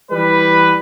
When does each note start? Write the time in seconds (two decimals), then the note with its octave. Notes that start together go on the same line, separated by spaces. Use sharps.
0.11 E3 G3 B4